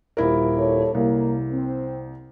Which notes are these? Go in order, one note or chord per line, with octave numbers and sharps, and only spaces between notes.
D#1 E4 A#4
D4 A4 C#5
C2 A#3
C4